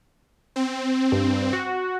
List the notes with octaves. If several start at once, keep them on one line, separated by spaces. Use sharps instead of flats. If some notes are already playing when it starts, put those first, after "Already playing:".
C4
G2
F#4